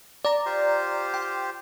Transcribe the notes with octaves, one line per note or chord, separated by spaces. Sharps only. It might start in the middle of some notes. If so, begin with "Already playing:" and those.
D5 A#5
F4 G4 C5
G5